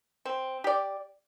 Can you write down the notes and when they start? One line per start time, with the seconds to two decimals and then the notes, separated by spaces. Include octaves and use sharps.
0.25 C4
0.64 G4 D5